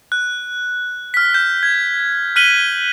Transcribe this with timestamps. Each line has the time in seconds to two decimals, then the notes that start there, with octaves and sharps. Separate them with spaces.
0.12 F#6
1.14 F6 B6
1.34 G6
1.63 G#6
2.36 F6 F#6 B6 D#7 F#7 G7